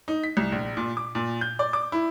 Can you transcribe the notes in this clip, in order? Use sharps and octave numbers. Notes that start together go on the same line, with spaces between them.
D#4
B6
C2
A#1
A#2
D6
A#2
G6
D5
D6
E4